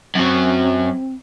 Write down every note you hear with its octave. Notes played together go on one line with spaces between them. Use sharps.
F#2 F#3 C4